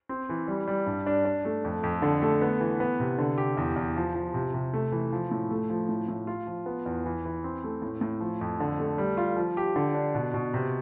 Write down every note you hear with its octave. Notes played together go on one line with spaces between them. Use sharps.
C4
E3
G3
G3
G2
D4
D4
A3
F2
F2
D3
A3
B3
E3
B3
C3
D3
G4
E2
E2
F3
F3
C3
C3
A3
E3
F3
A2
A3
F3
A2
A2
F4
F3
B3
E2
E3
E3
C4
A3
A2
A2
F3
F2
D3
A3
G3
F4
F3
G4
D3
D4
B2
B2
C3